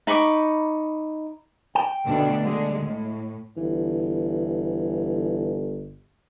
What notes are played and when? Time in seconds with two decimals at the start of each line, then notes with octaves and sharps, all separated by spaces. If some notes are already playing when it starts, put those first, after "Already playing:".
0.07 D#4 B5 C#6 D6
1.75 G5
2.04 D2 B2 D4
2.42 D3 G#3
2.81 A2
3.57 G1 E3